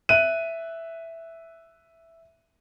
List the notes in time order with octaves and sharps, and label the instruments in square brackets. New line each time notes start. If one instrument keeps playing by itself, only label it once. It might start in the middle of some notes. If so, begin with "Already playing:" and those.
[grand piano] E5 F#6 D#7